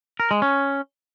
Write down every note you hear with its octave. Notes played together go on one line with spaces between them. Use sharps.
A#4
G#3
C#4